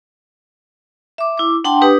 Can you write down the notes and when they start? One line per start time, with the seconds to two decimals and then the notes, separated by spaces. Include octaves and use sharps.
1.18 E5 D6
1.38 E4 D6
1.64 D4 F#5 G5 A5 C6
1.81 D4 G4 B4 D#6